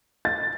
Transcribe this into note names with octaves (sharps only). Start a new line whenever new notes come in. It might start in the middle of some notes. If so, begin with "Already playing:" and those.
A6